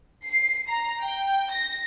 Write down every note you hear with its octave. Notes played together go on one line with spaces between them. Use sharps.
C7
A#5
G5
A#6